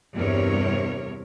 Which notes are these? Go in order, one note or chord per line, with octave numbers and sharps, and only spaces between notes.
E2 G2 C3 A#4 C#5